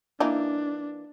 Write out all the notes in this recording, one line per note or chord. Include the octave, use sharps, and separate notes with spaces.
E3 A#3 D4 D#4